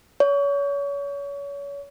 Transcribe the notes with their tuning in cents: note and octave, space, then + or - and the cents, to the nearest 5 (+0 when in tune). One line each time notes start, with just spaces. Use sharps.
C#5 +30